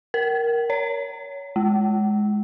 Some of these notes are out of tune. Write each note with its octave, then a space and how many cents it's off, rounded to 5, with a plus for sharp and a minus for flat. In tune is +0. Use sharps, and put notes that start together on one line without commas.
A#4 +5
C#5 +20
G#3 +10